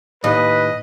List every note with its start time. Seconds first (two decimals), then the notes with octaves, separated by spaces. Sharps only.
0.24 D#2 A2 B4 D#5